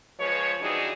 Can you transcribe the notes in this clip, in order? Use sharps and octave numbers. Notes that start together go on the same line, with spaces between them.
F3 G#3 B4 C#5
E3 G3 D4 D#4 F#4 G#4